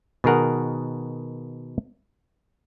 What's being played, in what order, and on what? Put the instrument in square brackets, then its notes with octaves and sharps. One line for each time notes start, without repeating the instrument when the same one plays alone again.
[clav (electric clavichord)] B2 D#3 G#4 A#4 F#5